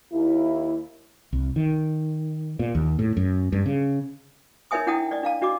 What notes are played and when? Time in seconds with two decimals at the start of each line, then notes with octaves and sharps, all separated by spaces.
0.13 D#2 E4
1.33 C2
1.56 D#3
2.59 A#2
2.75 D#2
2.99 A2
3.17 F#2
3.52 G2
3.66 C#3
4.71 D#4 A#4 C#5 E5 G#5 D#6
4.87 D4 E4 F#5 G5 A5 D#6
5.11 D5 D#5
5.23 D4 F5 A5
5.41 D4 F#4 D#5 D6